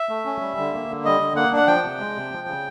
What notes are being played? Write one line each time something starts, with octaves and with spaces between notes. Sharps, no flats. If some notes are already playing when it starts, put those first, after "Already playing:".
Already playing: E5
A3
C#4
G3
D3
A#3
D3
G3 D#5
D3
A#3 F#5
D4 F#5
F3 G5
C3
G#3
C3
F3
C#3